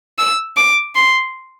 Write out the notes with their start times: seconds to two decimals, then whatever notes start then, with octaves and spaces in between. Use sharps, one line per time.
0.18 E6
0.57 D6
0.95 C6